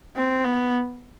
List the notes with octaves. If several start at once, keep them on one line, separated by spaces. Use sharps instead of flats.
C4
B3